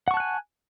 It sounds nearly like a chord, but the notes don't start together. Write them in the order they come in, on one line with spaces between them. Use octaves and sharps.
F#5 C#6 A5 F#6 G#5